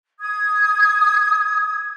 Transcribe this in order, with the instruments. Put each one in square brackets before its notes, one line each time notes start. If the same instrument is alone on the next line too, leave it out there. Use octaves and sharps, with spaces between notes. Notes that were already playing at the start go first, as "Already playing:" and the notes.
[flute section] D#6 G#6